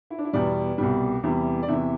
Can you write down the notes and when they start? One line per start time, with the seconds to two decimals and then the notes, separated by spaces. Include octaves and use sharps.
0.10 E4
0.18 D4
0.25 E4
0.33 E2 B2 G3 D5
0.78 C2 B2 G3
1.23 E2 C3 E3 G3
1.63 D5
1.68 E2 C3 E3 E5